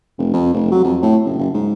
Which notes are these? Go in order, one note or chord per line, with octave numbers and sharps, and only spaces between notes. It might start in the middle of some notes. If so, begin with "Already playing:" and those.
F1
F2
F1
F#3
F2
A2
F#1
F#1
G#2